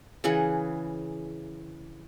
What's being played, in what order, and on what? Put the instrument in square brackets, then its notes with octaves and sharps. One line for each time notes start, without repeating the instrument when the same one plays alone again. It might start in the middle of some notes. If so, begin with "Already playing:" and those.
[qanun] C#3 E3 G#4 F#5